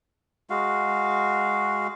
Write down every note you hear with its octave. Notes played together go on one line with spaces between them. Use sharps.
G#3 F#4 F5